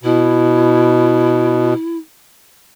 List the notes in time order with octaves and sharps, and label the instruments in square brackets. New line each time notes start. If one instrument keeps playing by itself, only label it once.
[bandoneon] B2 [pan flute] E4